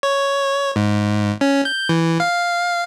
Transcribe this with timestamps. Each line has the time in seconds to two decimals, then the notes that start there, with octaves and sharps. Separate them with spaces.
0.03 C#5
0.76 G#2
1.41 C#4
1.65 G6
1.89 E3
2.20 F5